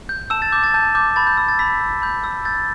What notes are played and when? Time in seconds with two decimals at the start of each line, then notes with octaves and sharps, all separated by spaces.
0.09 G6
0.30 A5 E6 E7
0.42 A6
0.52 D6 G6
0.64 A6
0.74 A5 G6
0.95 D6 G6
1.16 B5 A6
1.27 G6
1.37 E6 G6
1.49 A6
1.59 B5 E6 B6
1.81 G6
2.02 B5 G6
2.24 E6
2.45 G6 A6